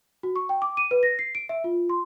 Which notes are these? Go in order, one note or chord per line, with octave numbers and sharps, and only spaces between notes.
F#4
C#6
G5
D6
D#7
B4
A#6
C7
D7
E5
F4
C6